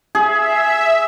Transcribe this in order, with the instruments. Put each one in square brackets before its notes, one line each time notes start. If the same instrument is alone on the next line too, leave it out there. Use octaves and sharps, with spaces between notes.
[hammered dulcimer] G#4 [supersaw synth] E5